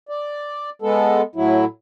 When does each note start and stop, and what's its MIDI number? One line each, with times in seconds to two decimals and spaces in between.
0.09 0.70 74
0.82 1.22 56
0.82 1.22 59
0.82 1.22 69
1.36 1.65 45
1.36 1.65 54
1.36 1.65 64